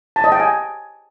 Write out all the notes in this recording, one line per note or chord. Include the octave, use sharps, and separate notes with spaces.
A5
D#5
G5
G#5